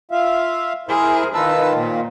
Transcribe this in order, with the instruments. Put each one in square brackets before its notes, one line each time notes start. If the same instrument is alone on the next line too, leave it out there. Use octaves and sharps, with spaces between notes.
[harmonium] F4 E5 F5
[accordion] E4 [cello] G#4 [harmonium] A#4 C5
[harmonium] D#3 F4 [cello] D#4 [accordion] B4 A5 E6
[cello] A#2 [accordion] C4